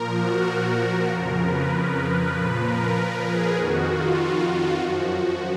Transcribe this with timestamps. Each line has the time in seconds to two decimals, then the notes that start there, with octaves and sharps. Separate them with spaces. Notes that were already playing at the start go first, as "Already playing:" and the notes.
Already playing: A#2 F3 A#4
0.18 F#4
0.49 F#4
1.09 F2 C#3 F3 A#4
1.40 B4
1.70 A#4
2.01 B4
2.32 A#2 F3 B4
2.62 A#4
3.23 G#4
3.54 F2 D#3 F#4
3.85 F4
4.46 F#4
4.76 F#2 F3